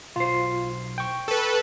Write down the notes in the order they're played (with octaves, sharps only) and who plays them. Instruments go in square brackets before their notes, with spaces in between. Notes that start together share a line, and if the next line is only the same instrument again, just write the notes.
[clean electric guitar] B1 C5 [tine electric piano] F4
[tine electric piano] G5 C#6
[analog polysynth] A4 B4